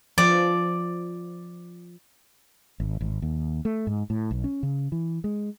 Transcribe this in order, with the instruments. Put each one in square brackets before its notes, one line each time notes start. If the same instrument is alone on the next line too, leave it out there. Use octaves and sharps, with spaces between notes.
[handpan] F3 [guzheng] D5
[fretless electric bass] G#1
G#1
D#2
A3
G#2
A2
B1
C#4
C#3
E3
G#3